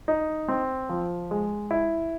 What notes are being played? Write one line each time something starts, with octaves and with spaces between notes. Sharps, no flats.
D#4
C4
F3
G#3
E4